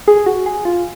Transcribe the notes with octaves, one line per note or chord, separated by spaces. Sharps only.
G#4
F#4
G#4
F4